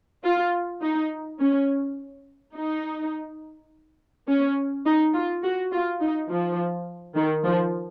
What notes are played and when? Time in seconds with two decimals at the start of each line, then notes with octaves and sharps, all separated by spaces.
0.24 F4
0.81 D#4
1.39 C#4
2.54 D#4
4.27 C#4
4.85 D#4
5.13 F4
5.43 F#4
5.71 F4
6.00 D#4
6.29 F3
7.16 D#3
7.44 F3